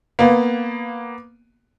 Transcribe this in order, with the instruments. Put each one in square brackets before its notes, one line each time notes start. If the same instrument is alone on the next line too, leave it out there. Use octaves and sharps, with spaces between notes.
[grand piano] A#3 B3